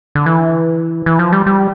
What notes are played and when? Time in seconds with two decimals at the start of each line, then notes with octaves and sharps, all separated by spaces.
0.15 D3
0.26 E3
1.06 E3
1.19 F3
1.32 G3
1.46 G3